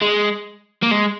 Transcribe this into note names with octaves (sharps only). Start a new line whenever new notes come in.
G#3
A#3
G#3